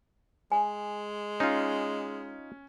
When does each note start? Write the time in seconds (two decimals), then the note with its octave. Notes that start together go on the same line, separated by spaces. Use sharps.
0.52 G#3 G#5
1.40 C#4 D#4 F4